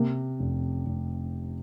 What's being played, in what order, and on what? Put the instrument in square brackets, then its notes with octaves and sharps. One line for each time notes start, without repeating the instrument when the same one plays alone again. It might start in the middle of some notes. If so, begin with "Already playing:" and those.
Already playing: [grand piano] C3 [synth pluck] A#3
[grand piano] F1
F1